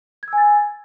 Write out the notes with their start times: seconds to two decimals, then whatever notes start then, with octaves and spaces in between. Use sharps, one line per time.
0.23 G#6
0.28 E6
0.33 G#5
0.38 A6